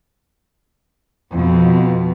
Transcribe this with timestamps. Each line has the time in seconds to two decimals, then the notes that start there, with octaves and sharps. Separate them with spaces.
1.31 F2 B2